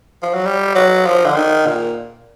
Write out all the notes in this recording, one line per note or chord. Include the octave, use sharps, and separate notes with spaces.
F3
F#3
G3
F#3
F3
D3
D#3
A#2